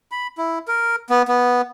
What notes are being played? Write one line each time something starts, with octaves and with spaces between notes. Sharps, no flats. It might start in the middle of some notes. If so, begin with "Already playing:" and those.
B5
E4
A#4
B3
B3